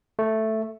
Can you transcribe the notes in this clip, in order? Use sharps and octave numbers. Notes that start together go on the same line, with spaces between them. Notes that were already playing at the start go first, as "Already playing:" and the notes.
A3